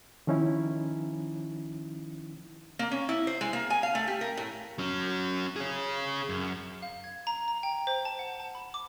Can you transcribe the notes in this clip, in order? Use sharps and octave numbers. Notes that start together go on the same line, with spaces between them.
D#3 F3 C#4 D#4 E4
A#3
C#4
E4
C5
G#3
A#3
G#5
F5
A3
G4
A#4
A2
F#3 C#4
G#4 C#5
F#2
F5
G#6
A#5
A#5
G5
C5
A5
F#5
A5
B5
D6